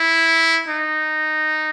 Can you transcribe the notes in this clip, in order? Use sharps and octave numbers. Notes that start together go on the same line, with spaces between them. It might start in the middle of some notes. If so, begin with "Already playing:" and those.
Already playing: E4
D#4